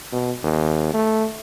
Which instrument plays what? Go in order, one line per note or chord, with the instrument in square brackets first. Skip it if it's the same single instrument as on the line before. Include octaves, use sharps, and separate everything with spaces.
[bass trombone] B2
D#2
A3